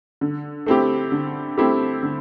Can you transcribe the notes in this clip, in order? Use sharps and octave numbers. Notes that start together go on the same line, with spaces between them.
D3
A3 C4 E4 G4
D3
A3 C4 E4 G4
D3